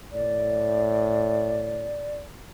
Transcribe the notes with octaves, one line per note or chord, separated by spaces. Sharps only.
A2 D5